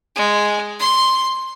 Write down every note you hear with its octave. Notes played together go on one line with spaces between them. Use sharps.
G#3
C6